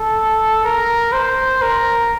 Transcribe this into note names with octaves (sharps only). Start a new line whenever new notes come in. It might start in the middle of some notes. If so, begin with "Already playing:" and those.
Already playing: A4
A#4
C5
A#4